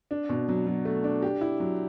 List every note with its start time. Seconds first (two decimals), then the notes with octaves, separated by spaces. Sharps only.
0.11 D4
0.29 B2
0.49 F#3
0.67 F#3
0.85 A3
1.04 D4
1.22 G4
1.41 E4
1.60 F#3